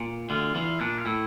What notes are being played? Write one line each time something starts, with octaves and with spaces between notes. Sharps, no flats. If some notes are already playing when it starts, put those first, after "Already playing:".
Already playing: A#2
D2 D3 F4
E2 E3 F4
A#2 D4
F4
A2 E4